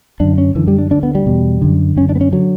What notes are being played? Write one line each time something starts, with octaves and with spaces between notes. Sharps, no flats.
F#2 D3 D4
C#4
F#2 D3 E3
G3
D4
D2 D3 D4
B3
G3
E2 B2
F#2 D3
F#2 D3 C#4
D4
B3
C#4
D3 F#3